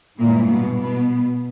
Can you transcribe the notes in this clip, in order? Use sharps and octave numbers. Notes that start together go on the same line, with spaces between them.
G2 A#2 E3 G#3 A#3
B2 B3
B2 B3